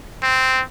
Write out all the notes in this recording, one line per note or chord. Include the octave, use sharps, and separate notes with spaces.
C4